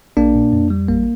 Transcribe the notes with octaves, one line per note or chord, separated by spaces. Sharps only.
A#1 A#3 D4
A#2
F2
G3
A1 A#3